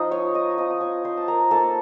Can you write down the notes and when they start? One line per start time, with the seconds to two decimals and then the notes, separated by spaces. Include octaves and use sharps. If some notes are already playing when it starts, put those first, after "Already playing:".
Already playing: F3 D#4 F4 D#5
0.11 C#5 C#6
0.34 D#5 D#6
0.58 F3 C4 F4 D#5 D#6
0.71 D#6
0.81 C#5 C#6
1.04 C5 C6
1.17 A5
1.28 A#4 A#5
1.51 A#3 D#4 A4 A5